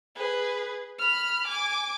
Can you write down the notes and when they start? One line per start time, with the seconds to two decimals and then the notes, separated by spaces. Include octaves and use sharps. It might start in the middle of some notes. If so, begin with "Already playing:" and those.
0.15 G#4 B4
0.98 B5 F6
1.47 G#5 D6